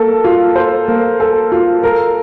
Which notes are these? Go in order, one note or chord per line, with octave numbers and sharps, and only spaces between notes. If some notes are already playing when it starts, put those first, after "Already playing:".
Already playing: A#3 A4
F4
C5
A#3
A4
F4
A#4